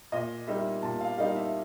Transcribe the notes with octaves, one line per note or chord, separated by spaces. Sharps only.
A#2 D#5
G3 A#3 D#4 E5
A#2 A5
F5
G3 A#3 D#4 F5
E5